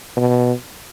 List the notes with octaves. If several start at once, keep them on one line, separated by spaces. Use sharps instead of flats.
B2